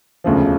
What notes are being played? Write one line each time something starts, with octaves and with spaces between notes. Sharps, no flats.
E1 D2 C#3 F3